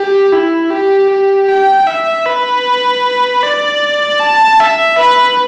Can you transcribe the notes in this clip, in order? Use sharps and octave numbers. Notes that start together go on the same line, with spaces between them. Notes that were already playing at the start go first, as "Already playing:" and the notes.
Already playing: G4
E4
G4
G4
G5
E5
B4
D5
A5
E5
B4